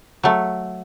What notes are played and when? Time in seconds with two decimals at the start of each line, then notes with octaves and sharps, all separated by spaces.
0.23 F#3 A3